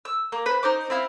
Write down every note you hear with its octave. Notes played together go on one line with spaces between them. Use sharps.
E6
A#3
B4 C5
D#4 C5 D6
C4 E4 F5